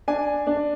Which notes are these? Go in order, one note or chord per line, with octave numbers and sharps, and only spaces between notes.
D4 G#5
D4